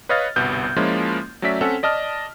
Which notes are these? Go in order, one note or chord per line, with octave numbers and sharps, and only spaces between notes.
B4 C#5 D#5 F5 F6 A6
G1 C2 B2 B3 G6
F3 G#3 A#3 C#4 E4 F4
F#3 A3 C#4 D5 E5 B6
C4 C#4 A4 F#5
D5 D#5 A5 F6